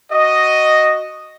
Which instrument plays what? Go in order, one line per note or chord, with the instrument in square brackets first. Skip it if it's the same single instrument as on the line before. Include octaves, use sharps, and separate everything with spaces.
[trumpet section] F#4 D#5